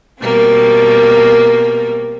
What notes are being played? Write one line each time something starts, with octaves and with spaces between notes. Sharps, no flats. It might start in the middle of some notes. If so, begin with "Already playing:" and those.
B2 G3 A#3 C4